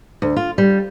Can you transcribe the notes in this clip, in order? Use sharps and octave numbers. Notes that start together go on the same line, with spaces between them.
D2
F4
G3